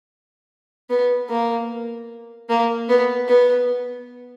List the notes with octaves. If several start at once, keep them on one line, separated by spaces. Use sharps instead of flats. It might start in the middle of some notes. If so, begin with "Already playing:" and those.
B3
A#3
A#3
B3
B3